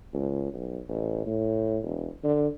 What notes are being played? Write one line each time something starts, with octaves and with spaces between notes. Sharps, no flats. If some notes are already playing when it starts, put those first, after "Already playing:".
C#2
B1
A1
A2
E1
D3